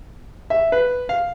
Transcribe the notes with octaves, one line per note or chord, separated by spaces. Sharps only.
E5
B4
F5